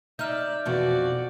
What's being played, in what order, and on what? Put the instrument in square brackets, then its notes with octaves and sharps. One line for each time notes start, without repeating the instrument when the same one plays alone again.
[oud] D#4 [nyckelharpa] D5 E5 [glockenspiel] F6 G6
[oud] F2 B2 E3 [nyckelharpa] F#4 D5